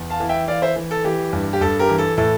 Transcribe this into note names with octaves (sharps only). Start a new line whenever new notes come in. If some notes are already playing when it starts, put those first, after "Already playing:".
Already playing: E2
F5 A5
E3
E5 G5
E3 D5 F5
C5 E5
E3
A4
E3 G4
G2
G4
G2 A4
G4 A#4
E3
A4
A2 A4